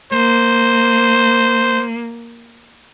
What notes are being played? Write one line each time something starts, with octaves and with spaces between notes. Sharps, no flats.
A#3 C5